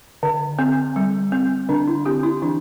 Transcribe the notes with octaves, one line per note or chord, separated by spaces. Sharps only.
D3
C4
G3
C4
D3 D4
E4
C4 G4
E4
E3 D4